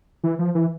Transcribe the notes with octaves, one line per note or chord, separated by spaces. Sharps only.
E3
F3
E3